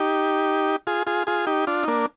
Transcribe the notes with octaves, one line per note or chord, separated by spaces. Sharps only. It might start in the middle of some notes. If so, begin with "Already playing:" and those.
Already playing: D#4 G4
F4 G#4
F4 G#4
F4 G#4
D#4 G4
D4 F4
D#4
A#3 D4